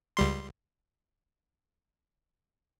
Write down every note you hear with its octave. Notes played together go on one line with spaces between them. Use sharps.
C#2 G3 C6